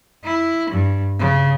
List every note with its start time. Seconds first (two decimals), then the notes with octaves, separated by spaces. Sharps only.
0.24 E4
0.70 G2
1.19 C#3